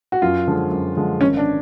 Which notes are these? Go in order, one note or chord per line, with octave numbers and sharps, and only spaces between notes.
F#4
F#2 F4
D3 F3 G#3
F#2
D3 F3 G#3
G#1 C#4
D4